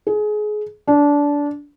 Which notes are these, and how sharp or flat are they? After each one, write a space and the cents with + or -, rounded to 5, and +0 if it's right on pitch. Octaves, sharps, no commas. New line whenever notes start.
G#4 +25
D4 -20